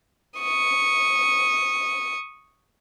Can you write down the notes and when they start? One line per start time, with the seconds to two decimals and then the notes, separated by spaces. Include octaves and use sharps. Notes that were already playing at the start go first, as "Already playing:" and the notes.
0.39 C#6 D#6